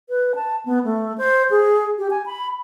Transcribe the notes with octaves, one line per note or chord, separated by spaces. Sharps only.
B4
A5
B3
A3
C5
G#4
G4
G#5
B5